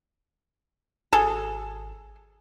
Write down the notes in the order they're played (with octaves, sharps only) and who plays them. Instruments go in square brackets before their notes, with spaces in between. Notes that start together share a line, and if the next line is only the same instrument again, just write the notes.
[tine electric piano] G#1 [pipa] G#4 A4